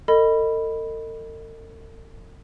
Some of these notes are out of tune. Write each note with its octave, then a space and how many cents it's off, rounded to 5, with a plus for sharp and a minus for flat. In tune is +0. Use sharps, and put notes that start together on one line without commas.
A4 +45 D#5 -10 B5 +0